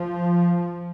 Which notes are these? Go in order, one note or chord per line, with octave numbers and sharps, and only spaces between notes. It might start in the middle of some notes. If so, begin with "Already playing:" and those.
Already playing: F3